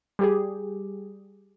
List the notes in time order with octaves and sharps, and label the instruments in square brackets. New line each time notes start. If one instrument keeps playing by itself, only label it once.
[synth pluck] G3 G4 G#4